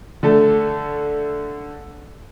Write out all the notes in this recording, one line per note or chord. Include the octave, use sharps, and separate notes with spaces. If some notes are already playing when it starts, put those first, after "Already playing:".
D3 A3 A4